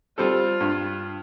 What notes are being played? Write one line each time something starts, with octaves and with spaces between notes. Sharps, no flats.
G3 C4 F4 A4
G2